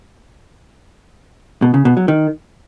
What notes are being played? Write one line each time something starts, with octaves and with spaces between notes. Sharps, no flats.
B2
C#3
B2
F#3
D#3